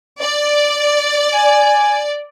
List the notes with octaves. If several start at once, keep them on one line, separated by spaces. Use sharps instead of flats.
D5
G#5